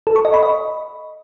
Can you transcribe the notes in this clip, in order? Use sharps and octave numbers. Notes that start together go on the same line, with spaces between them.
A4
C#6
D#5
B5
D#5